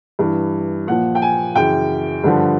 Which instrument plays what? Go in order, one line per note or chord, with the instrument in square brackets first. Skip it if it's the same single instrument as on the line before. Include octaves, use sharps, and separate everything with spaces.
[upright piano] G2 E3
A#2 F3 F#5
G5
G#5
F#2 C#3 E3 G5
G2 D3 F3